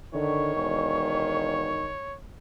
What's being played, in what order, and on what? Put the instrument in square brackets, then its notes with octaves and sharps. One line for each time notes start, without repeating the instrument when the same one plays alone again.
[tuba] D3 [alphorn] D#3 [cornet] C#5 [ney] C#6
[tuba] E1